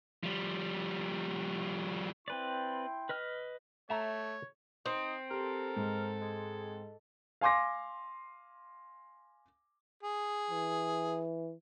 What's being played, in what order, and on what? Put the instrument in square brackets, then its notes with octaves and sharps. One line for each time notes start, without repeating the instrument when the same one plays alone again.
[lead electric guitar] F3 G3
[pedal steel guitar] C4 B4 D5 [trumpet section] E4 G5 C6
[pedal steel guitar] B4 D#5 F6
[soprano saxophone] A3 [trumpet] C#5 [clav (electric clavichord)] E5 A#5
[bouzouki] C4 [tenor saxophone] D#4
[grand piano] G4 [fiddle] A4 [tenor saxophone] A#4
[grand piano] G#2
[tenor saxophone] G#3
[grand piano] F5 G#5 C6 D6 A#6
[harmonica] G#4
[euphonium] E3